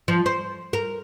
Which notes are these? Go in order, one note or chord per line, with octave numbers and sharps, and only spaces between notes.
F3
C5
A#4